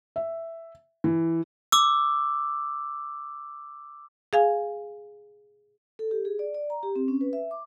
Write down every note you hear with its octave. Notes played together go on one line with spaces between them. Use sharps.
E5
E3
D6 E6
G#4 F5 G#5
A4
G4
G#4
D5
D5
A#5
G4
C4
C#4
B4
E5
D6